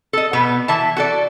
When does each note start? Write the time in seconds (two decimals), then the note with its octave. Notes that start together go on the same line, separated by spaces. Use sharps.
0.13 A4 D#5
0.33 B2 B3
0.68 E3 E5 A5
0.97 F#4 A4 D5